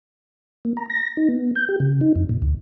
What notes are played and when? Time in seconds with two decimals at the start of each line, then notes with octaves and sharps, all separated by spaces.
0.65 A#3
0.77 A#5
0.90 A#6
1.17 D#4
1.29 B3
1.55 G6
1.69 G4
1.80 C#3
2.01 D#4
2.16 F2
2.29 A#2
2.42 D2